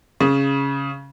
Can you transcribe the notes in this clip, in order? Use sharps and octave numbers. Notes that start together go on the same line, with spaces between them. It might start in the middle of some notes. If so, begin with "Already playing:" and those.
C#3